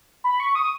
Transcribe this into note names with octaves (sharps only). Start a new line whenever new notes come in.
B5
C#6
D#6